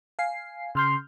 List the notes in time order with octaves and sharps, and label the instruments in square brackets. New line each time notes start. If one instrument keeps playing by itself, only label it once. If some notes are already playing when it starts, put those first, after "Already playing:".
[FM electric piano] F5 G#5 C7
[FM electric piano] C#3 F6 G6 [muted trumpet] C6